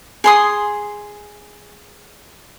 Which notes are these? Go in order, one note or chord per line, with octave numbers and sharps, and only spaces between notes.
G#4 C6 D#6